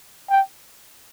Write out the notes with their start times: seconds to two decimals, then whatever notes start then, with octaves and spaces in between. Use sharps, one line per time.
0.30 G5